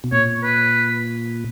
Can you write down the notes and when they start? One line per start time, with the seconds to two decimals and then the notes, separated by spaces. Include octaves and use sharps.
0.04 B2
0.12 A#2 C#5
0.43 B4